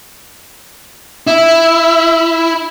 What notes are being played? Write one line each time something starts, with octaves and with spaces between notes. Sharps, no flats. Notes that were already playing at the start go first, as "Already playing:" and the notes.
E4